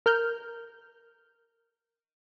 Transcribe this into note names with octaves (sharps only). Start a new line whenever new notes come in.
A#4 F6 G6